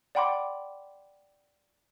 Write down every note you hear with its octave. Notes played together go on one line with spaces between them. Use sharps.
D5 F#5 G5 B5 C6 D6